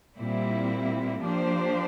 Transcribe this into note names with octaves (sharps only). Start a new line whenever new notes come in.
A#2 G3 C4 E4
F3 A#3 D4 G4 C5